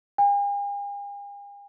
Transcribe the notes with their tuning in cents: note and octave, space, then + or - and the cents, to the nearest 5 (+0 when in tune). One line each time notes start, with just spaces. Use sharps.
G#5 -45